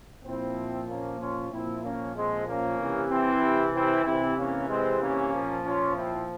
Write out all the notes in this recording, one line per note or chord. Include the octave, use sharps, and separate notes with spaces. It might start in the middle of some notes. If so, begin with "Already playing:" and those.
A#2 F3 C4 E4
A#3 C#4
C#4 F4
A#2 F3 C4 E4
A#3 C#4
G#3 C4
A#3 C#4
C3 E3
C4 E4
C4 E4
C3 E3 C4 E4
A#3 C#4
G#3 C4
A#3 C#4
A#2 F3
C#4 F4
C4 E4